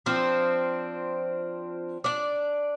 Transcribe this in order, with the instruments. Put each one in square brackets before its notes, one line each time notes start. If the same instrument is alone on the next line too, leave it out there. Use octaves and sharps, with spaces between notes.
[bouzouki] F3 C4 D4
D4 D5